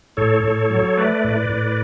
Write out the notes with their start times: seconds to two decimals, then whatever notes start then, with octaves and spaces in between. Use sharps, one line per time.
0.17 A2 A4 C#5
0.44 A2
0.70 F#3
0.97 A3 B4 D5
1.24 A2
1.50 A2